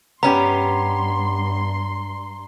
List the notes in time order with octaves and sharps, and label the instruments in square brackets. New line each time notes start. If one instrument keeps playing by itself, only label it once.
[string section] G2 C6 [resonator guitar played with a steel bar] B3 C#4 G4 [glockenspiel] A#5